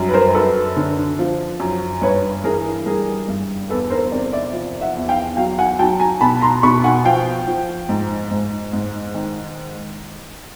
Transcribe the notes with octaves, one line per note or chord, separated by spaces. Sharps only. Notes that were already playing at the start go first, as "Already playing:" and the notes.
Already playing: F#2 G3
B4
A#4 C5
F#2 A4 B4
D3
F3
F#2
G2 B4 C#5
E3 G#4 A#4
G3 G#4 A#4
G2
E2 A4 B4
A#4 C5
C3 C5 D5
D5 E5
F3
E5 F#5
E2
F5 G5
F#3 F5 G5
F#5 G#5
F#3 G5 A5
G#5 A#5
B2 A5 B5
A#5 C6
B2 B5 C#6
F#5 G#5
F3 F5 G5
F3
G#2
G#2
G#2
D#3